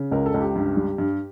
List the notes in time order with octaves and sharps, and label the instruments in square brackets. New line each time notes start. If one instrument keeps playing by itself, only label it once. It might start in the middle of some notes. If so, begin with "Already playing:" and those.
Already playing: [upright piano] C#3
C#2 A#4
A4
C#2
G4
G2
G3
G2